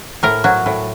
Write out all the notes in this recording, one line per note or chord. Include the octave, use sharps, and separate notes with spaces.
A2 A#4
F#3
A2